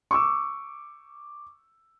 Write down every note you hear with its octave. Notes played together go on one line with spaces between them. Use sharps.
C#6 D6 E6